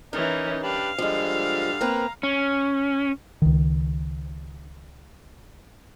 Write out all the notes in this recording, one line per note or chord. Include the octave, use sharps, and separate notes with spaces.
E3 C#4 D#4 A#4
D4 G4 B4 F5
D3 F3 G3 G#3
A#3 C4 B4 A#5
C#4
C#2 D#3